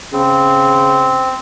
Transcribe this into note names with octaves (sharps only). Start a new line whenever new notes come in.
C#3 C4